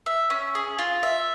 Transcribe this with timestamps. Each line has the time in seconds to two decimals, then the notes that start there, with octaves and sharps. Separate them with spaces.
0.06 E5
0.30 C#4
0.55 G#4
0.79 F4
1.03 E5